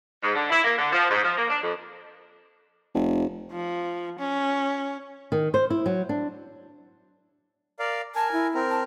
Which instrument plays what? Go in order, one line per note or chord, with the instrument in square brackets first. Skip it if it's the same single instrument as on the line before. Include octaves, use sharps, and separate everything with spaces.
[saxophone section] G#2
D3
E4
A#3
D3
F3
G#2
F3
A#3
D4
F2
[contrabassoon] F1
[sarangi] F3
C#4
[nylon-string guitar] D#3
C5
E4
F#3
D4
[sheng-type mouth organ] A#4 D5 F5
[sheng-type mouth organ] A#4 G#5 [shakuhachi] A5
[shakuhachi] E4
[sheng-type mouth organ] C4 A#4
[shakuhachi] A5